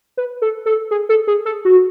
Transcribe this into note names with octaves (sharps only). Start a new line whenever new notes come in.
B4
A4
A4
G#4
A4
G#4
A4
F#4